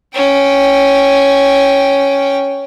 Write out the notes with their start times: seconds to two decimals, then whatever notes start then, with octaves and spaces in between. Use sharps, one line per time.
0.14 C#4 G5